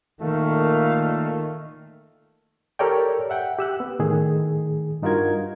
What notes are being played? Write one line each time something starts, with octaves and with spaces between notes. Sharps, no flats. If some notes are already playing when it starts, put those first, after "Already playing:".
A#2 D#3 A3 F5
G4 A4 A#4 C#5 D5 G5
E5 F#5 G5
G4 E6 F#6
B3
A2 D#3 G#4
G2 D#4 F4 F#4 A#4 G#6